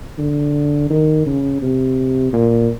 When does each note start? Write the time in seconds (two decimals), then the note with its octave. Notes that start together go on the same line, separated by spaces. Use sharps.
0.18 D3
0.90 D#3
1.26 C#3
1.62 C3
2.33 A#2